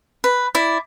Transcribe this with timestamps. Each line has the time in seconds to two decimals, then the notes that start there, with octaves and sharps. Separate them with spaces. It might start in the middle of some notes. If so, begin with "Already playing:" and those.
0.24 B4
0.55 E4 D5